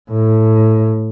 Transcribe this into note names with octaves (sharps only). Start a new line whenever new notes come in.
A2